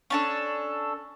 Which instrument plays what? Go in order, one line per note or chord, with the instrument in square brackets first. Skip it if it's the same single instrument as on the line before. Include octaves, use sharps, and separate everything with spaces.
[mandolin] C#4 D4 A4